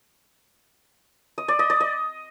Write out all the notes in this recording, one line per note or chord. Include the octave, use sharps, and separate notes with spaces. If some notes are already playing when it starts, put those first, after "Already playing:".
D#5
D5
D#5
D5
D#5